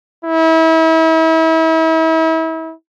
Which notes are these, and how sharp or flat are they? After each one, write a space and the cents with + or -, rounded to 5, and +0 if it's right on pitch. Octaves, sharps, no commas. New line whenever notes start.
E4 -35